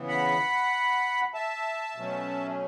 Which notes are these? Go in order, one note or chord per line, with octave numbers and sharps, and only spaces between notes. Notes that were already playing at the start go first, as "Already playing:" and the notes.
Already playing: C#3 E3 B3
F#5 B5
E5 A5
B2 F#3 A3 C#4